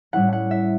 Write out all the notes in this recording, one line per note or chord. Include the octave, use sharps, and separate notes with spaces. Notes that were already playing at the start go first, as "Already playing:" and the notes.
A2 G3 C#4 E4 F#5
F#5
E5